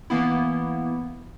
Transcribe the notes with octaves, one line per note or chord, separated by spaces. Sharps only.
E3 A#3 B3 E4